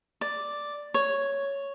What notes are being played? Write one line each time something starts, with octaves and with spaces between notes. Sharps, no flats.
D5
C#5